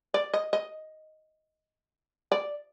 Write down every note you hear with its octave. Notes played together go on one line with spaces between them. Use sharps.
D5
D#5
D#5
D5